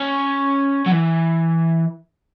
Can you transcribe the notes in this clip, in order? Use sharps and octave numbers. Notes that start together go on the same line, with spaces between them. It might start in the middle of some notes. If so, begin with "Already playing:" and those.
Already playing: C#4
F#3
E3